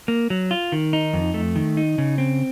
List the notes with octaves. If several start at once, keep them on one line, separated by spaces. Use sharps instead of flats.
A#3
F#3
F4
D#3
D#4
F2
A3
D#3
D#4
C#3
C4